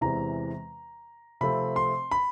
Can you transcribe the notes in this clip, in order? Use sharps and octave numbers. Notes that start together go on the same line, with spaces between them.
E2 C3 E3 G#3 C4 A#5
C3 F3 A3 C4 B5
C6
B5